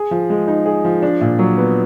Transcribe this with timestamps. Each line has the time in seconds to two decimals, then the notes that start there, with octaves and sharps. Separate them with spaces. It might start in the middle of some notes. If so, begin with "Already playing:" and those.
Already playing: G#4
0.11 F3
0.30 G#3
0.48 D#4
0.66 G#4
0.85 F3
1.02 D4
1.21 A#2
1.39 F#3
1.58 B3